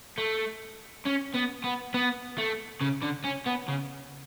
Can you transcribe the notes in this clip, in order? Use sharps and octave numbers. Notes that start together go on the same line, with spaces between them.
A3
C#4
B3
B3
B3
A3
C#3
D3
C#4
B3
C#3